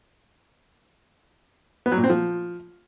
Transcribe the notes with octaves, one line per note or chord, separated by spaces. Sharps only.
B3
F#3
A#2
C4
F3